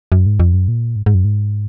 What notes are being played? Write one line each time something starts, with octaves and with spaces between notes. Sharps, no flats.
F#2
G#2
F2
F#2
A#2
G#2
G#2
F#2
G#2